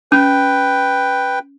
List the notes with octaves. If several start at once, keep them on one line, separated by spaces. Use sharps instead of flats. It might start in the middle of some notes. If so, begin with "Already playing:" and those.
C#4 B4 G5